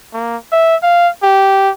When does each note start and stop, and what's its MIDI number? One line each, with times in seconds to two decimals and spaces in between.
0.13 0.37 58
0.52 0.76 76
0.83 1.09 77
1.23 1.70 67